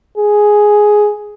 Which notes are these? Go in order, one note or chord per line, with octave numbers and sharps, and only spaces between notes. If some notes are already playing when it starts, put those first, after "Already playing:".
G#4